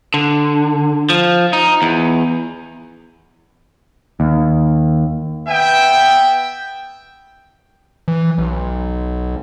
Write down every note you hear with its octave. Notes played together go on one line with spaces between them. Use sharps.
D3
F3
D#4
E2
D#2
B3 E5 G5
E3
B1